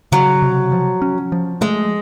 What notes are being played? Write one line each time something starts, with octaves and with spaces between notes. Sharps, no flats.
C#3 F#3
C3
F3
C#4
F3
G#3 A3